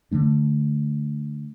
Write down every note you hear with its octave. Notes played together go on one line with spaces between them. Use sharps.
D3 F3 A3 D4